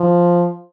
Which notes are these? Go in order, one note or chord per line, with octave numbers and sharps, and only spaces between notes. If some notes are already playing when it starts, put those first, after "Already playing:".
Already playing: F3